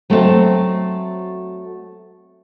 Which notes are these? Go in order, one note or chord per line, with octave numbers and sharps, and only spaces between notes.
F#3 A3 C4 E5 F5 A5